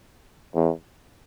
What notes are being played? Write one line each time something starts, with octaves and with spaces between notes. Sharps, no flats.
E2